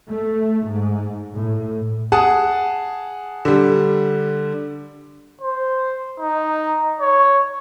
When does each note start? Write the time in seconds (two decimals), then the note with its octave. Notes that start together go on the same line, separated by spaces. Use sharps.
0.10 A3
0.67 G#2
1.36 A2
2.12 G#4 F#5 A5 D#6
3.45 D3 G3
5.41 C5
6.20 D#4
7.00 C#5